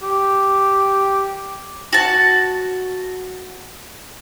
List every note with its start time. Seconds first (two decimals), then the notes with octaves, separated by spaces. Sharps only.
0.03 G4
1.93 F#4 A5